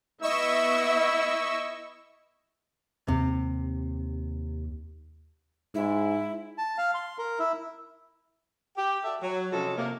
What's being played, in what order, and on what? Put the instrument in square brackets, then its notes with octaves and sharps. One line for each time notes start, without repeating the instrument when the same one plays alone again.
[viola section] B3 E5 [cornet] E4 [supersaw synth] D#5 C#6 E6
[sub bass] D#2 [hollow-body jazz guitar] C3
[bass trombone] G#2 [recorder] E4
[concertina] A5
F5
C6
A#4
E4
[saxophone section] G4
F#4 G4 A4 D5 E5
F#3
C3 F3 G#3 C#4 F#4 A4
C3 A#3